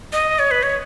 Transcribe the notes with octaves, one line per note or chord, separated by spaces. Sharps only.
D#5
C#5
B4
C#5